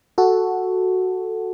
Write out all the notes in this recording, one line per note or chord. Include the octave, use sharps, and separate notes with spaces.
F#4 A4